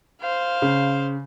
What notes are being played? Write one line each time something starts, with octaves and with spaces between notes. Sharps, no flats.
C5 F5
C#3